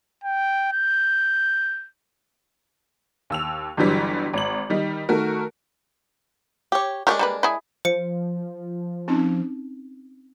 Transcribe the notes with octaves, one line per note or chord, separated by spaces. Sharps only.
G5
G6
D#2 E6 F7
G1 D3 E3 F#3 G3
G#1 F#7
D#3 G3 D#4
D#3 A3 F#4 A#4
G4 C#5
G#3 A3 D4 G4 A#4 C#5
G3 A#3 B4
E4 G#4
F3 C5 C#7
C4 C#4 D#4